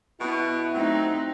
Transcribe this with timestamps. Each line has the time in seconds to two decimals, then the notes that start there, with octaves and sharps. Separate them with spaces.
0.20 B2 B3 E4
0.74 F#3 A3 C4 D#4